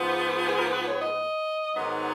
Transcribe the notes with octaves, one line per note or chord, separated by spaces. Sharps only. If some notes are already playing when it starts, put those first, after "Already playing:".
Already playing: G#2 F3 B3
G#4
A#4
B4
C#5
D#5
G#2 D#3 F#3 B3 D#4